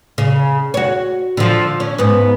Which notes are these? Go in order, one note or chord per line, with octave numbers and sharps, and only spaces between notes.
C#3
F#4 C#5
D3 F3
C#4
G#2 B3